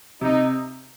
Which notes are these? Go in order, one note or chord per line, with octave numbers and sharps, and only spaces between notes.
C3 D#4